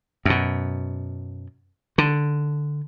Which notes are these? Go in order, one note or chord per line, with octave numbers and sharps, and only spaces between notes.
F#2 B2
D3